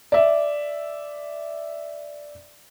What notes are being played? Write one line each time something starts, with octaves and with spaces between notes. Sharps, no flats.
D5 E5